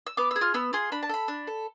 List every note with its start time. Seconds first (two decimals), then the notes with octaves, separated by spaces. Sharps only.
0.07 E6
0.17 B3 D6
0.31 G#4 E6
0.41 F4 F6
0.54 B3 E6
0.73 F4 G#4 C6
0.92 D4 B5
1.03 A5
1.09 A4 B5
1.28 D4
1.47 A4